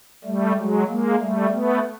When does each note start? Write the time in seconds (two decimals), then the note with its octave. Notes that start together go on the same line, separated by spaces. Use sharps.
0.24 G3 A3
0.56 F#3 G#3
0.87 G#3 A#3
1.19 G3 A3
1.51 A3 B3